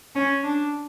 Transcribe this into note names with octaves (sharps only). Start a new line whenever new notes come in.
C#4
D4